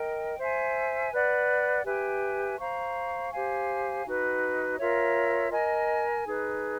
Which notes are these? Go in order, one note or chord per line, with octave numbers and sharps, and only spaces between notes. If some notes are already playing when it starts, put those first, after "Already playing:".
Already playing: A#4 D#5 G5
C5 E5 G#5
B4 D5 F#5
G4 B4 E5 G#5
C5 F5 A#5 C#6
G4 C5 F5 G#5
D#4 F#4 B4
F4 A#4 C#5 E5
A#4 D#5 G#5
D#4 G#4 B4